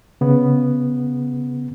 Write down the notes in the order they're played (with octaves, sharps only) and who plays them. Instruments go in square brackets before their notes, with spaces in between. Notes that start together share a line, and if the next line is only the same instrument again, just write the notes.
[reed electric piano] C#3 B3